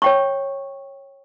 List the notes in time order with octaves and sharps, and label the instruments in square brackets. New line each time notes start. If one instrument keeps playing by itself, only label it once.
[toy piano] C#5 G5 C#6